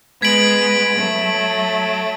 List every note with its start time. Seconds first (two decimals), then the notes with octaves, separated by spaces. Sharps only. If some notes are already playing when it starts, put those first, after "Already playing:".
0.22 G#3 B3 G#6 B6 D7 F#7
0.99 F#3 A3